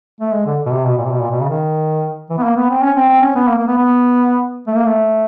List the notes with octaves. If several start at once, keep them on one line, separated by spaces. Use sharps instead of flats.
A3
G#3
D3
B2
C3
B2
A#2
C3
B2
A#2
B2
C#3
D#3
E3
B3
A#3
B3
C4
C#4
C4
C4
C#4
B3
A#3
A#3
B3
B3
A3
A#3
A3